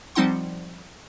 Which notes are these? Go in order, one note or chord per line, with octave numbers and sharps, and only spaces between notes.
F3 G3 C4 D#4 F#5 C6